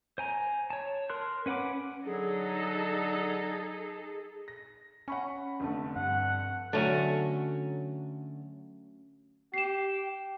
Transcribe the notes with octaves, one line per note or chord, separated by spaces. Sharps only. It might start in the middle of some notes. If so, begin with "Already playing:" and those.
C5 G#5 A#5
C#5 A5
A#4 C6 F#6
C#4 B4 F#5 B5 D6
D3 F#3 D#4 G#4 A4
A#6
C#4 F#5 B5 C#6
F1 D3 A3
G2 F#5
D3 F#3 A3 C#4 F#4
G4 C7 E7